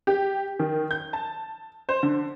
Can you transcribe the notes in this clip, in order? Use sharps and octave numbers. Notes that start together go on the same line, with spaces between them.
G4
D#3
G6
A5
C5
D3